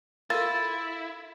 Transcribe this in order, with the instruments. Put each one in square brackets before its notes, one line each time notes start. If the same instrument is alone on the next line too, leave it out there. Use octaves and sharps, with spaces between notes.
[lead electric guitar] E4 [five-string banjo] F4 [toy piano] A4 A#4 [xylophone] A6